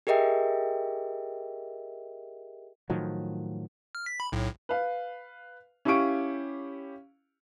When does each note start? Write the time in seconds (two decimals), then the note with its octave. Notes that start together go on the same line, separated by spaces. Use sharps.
0.07 G4 G#4 A#4 D#5 E5 G5
2.90 A2 D#3 F3 F#3
3.95 F6
4.06 B6
4.20 B5
4.32 B1 A2
4.69 B4 F5
5.85 C#4 E4 G4 F5 C#6 D7